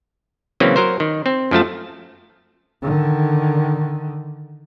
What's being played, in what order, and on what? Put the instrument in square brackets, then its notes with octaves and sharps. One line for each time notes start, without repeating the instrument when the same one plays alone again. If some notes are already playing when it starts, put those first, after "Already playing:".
[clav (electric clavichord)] C#3 E3 F#3 A#3 C4
F#3 A#4 C5
D#3
C4
F#2 F3 A3 A5
[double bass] D3 D#3